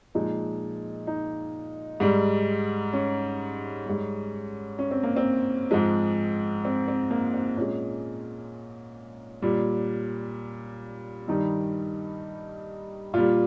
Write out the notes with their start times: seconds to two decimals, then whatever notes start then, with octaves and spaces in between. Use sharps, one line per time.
0.15 A#2 F3 G#3 D#4
1.07 D#4
2.00 G#2 G3
2.93 C#4
3.86 G#2 G3
4.79 C#4
4.91 C4
5.03 A#3
5.16 C4
5.71 G#2 F3 G#3
6.65 C4
6.88 C4
7.11 A#3
7.34 C4
7.57 A#2 G#3 C#4
9.42 A#2 G3
11.28 G2 D#3 G3 D#4
13.13 A#2 G3 F4